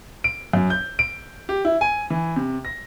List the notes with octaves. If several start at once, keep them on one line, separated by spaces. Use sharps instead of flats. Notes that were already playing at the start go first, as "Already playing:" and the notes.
D7
F#2
G6
D7
G4
E4
G#5
E3
C3
A#6